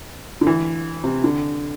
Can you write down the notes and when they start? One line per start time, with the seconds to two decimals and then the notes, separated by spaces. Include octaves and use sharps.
0.41 D3
0.47 E3
1.04 C3
1.24 D3